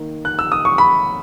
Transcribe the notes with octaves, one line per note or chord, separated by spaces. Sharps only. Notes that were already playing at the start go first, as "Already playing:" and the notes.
Already playing: D#3 A#3
F#6
E6
D#6
C#6
B5